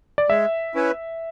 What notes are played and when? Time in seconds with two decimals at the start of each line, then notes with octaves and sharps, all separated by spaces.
0.18 D5
0.30 G#3 E5
0.75 C#4 E4 B4